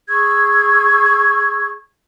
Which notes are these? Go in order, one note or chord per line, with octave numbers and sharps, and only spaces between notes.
G#4 C#6 E6 G#6